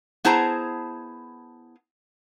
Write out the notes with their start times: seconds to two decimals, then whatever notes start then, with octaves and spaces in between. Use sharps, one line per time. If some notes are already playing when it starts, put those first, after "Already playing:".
0.25 B3 E4 G#4 C5 A5 A#5